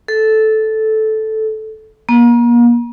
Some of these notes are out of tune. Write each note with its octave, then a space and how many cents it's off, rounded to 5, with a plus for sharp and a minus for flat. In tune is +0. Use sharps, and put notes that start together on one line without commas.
A4 -10
A#3 +35